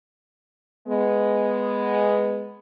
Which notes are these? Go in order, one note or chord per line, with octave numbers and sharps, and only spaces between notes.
G#3 B3